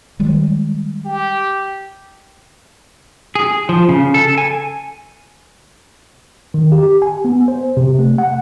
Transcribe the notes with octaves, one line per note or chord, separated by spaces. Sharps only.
D#3 G3 G#3
G4
G#4
F3
C#3
A4
G#5
D#3
G4
G#5
B3
C5
C3
A3
F#5